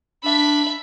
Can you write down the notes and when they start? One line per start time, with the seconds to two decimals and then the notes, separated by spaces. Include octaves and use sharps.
0.23 D4 E5 B5